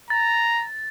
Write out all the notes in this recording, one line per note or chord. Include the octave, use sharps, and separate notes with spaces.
A#5 A6